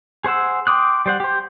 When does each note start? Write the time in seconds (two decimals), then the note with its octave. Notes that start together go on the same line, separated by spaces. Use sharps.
0.24 G#4 C5 F#5 E6
0.67 G5 C6 D6 D#6 F#6
1.06 G3 C5 F#5
1.20 G4 C5